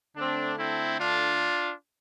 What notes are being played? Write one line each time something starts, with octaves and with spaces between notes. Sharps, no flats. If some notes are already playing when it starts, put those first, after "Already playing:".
D3 A3 C4 D4
C4 E4
D4 F4